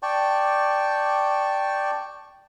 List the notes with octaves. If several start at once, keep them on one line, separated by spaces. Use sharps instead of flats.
D5 G5 A5 C#6